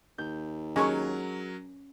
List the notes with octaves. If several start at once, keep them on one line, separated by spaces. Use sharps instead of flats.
D#2 G6
F#3 G#3 C#4 A#4 C#6